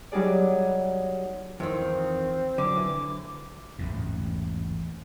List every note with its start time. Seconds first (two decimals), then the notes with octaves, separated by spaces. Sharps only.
0.12 F#3 G3 D#4 G#4 D5
1.60 F2 D#3 E3 C4
2.58 D3 F#3 D6
2.76 E3
3.79 A1 E2 G#2